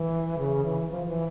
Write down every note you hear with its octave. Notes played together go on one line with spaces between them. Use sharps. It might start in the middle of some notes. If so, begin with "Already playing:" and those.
Already playing: E3
C#3
E3
F3
E3